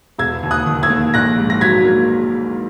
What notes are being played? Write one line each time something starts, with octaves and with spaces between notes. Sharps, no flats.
E1 E6 G#6
D#2
D#6 F#6
D#3
E6 G#6
A#3
A#1 F#6 A#6
G#2
A#6
F#3 G#6 B6
A#3